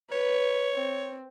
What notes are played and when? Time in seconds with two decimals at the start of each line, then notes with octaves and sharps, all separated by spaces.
0.12 B4 C#5
0.75 C4